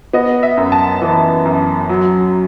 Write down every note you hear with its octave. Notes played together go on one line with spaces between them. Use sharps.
B3 D#5
E5
F#2
A5
E3
F#2
F#3